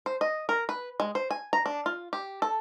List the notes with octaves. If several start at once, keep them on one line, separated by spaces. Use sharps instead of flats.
C5
D#5
A#4
B4
G#3
C5
G#5
A#5
D4
F4
G4
A4